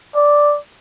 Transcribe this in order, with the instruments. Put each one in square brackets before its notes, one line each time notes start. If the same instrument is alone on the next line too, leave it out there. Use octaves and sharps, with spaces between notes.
[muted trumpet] D5